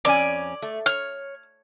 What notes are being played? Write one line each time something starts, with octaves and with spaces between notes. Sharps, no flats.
F2 C#4 D5 G#5
A3
C#5 F6